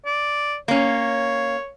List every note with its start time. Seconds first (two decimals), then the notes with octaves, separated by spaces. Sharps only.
0.06 D5
0.68 A#3 C#4 C#5